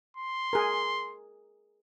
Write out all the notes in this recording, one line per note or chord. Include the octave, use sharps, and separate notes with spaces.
C6
G#4 A#4